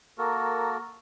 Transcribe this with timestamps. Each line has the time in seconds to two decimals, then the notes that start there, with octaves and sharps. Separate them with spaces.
0.18 A#3 F#4 A4 A#4